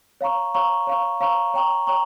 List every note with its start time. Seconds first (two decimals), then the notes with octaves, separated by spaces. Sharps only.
0.21 C#5 F5 A#5 C#6
0.54 C#5 F5 A#5 C#6
0.87 C#5 F5 A#5 C#6
1.20 C#5 F5 A#5 C#6
1.54 C#5 G5 A#5 C#6
1.87 C#5 G5 A#5 C#6